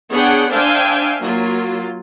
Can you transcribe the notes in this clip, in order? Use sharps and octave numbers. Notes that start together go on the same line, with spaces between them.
B3 D4 G#4 C#5 F#5 G5
D4 C5 E5 F5 G5 G#5
F#3 A#3 F4